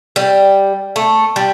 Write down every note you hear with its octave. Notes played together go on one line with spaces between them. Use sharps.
G3
A3
G3